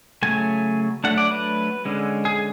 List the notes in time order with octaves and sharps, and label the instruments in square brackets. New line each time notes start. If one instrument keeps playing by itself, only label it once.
[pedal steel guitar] C#3 F#3 A3 G#5
F#3 A3 D4 F#5
D5
B4
D3 G#3 C#4
G#4